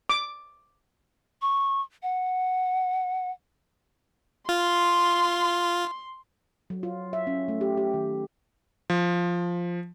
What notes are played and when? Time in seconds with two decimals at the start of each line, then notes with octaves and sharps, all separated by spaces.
0.09 D6
1.42 C#6
2.03 F#5
4.49 F4 C6
6.70 F#3
6.83 F4
7.13 E5
7.27 C#4
7.48 A3
7.61 G4
7.77 G4
7.94 D#3
8.90 F3